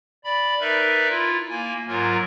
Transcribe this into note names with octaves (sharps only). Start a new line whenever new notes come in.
D5 B5
D#4 A#4 B4 D5 E5
E4 F4
A#3 G#5
G#2 F#3 F4 A#4